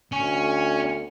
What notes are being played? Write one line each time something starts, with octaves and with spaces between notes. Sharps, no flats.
D2 C#4